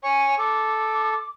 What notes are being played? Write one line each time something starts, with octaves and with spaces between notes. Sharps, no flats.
C#5 G#5 C#6
A4 D6